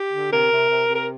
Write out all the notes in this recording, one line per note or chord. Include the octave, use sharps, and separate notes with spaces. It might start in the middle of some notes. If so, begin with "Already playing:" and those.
Already playing: G4
D3
C3 A#4
C3
C3
C3
A#4